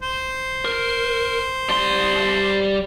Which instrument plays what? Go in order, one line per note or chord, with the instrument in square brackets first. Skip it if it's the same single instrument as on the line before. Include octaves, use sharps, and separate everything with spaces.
[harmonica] C5
[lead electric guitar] A#4
G3 C6